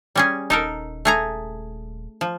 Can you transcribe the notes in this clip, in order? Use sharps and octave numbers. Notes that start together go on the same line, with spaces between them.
G3 C#4 G#4
D#1 D#4 A4 A#4
A3 G#4 A#5
F3